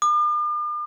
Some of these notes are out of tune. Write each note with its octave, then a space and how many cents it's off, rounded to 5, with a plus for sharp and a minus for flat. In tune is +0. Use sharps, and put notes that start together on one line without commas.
D6 +45